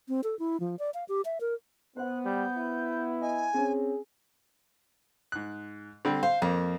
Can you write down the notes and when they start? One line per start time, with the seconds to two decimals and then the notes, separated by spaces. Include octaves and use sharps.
0.09 C4
0.24 A4
0.39 E4
0.60 F3
0.79 D5
0.94 F5
1.09 G4
1.25 E5
1.41 A#4
1.97 B3 C5 F#5 F#6
2.25 G3 G6
2.57 E4
3.21 D#5 G#5
3.54 C4 C#4 G#4
5.32 G#2 F#6
6.05 D3 G3 C4
6.23 C5 F5
6.42 F2 F3 A#3